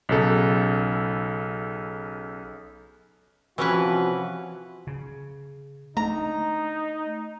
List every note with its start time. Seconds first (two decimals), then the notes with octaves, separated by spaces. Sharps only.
0.09 B1 C#3 A4
3.58 C3 E3 F3 C#4 F#4 B4
4.87 C#3
5.97 A3 D4 D#4 A#5